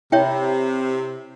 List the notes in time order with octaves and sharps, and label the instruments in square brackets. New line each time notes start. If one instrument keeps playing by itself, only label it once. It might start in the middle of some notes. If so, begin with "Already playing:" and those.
[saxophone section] C3 [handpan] E4 [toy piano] C#5 E5 G5